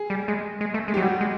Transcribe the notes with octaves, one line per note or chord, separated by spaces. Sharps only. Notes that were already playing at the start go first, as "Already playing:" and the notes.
Already playing: G#4
G3
G#3
G#3
A3
G#3
G4
F#3
G3 F#4
G#3